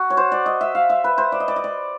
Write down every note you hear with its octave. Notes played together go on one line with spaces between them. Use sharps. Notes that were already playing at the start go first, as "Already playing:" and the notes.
Already playing: F#4
C#5
C5
D5
D#5
E5
F5
E5
B4
C5
D5
D#5
D5
D#5
D5